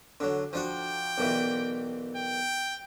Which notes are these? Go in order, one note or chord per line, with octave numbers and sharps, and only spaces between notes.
D3 F#3
F3 D4 F#4 G5
B1 A#2 E3
G5